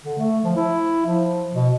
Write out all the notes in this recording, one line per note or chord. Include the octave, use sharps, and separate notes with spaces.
D3
A3
F3
E4
F3
B2